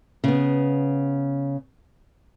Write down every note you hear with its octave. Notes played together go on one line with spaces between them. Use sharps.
C#3 B3